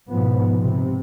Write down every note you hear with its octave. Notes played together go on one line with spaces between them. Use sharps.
G#2 B2 F3 B3
C3